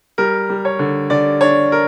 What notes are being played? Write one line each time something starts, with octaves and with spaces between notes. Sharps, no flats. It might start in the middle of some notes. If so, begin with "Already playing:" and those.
G3 A#4
G3
C#5
D3
D3 D5
D4 C#5
A#4